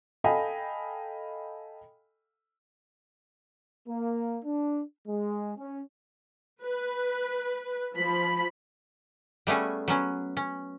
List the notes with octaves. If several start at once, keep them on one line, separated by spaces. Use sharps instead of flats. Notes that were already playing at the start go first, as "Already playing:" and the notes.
A4 D#5 F5 G5 G#5 B5
A#3
D4
G#3
C#4
B4
F3 B5
G3 A3 B3 C#4 G#4
F#3 B3 C#4
C#4